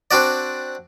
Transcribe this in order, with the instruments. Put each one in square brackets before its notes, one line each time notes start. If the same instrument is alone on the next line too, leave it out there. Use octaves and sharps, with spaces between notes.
[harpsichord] C4 D4 F#4 D5